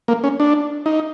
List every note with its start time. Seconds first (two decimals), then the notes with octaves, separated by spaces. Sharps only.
0.08 A#3
0.24 C#4
0.40 D4
0.86 D#4